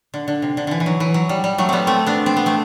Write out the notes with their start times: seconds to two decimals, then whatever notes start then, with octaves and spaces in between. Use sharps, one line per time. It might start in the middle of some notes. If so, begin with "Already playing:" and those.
0.14 D3
0.28 D3
0.42 C3
0.57 D3
0.67 D3 E3
0.80 E3
0.86 F#3
1.00 E3
1.14 F#3
1.29 G3
1.44 G3
1.58 F#3 A3
1.69 G3 B3 C4
1.87 A3 C4
2.06 B3 D4
2.26 C4
2.37 B3
2.46 A3 C4